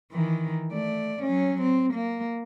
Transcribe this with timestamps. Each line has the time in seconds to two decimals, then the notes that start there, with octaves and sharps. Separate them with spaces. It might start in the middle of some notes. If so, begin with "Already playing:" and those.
0.11 D#3 E3
0.72 A3 D5
1.22 F#3 C#4
1.62 C4
1.94 A#3